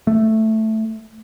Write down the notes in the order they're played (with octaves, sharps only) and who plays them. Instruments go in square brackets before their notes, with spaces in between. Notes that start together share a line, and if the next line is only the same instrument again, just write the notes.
[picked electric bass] A3